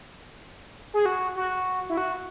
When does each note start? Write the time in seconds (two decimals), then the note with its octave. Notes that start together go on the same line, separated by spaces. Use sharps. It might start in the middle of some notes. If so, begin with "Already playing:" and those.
0.94 G#4
1.06 F#4
1.36 F#4
1.90 E4
1.97 F#4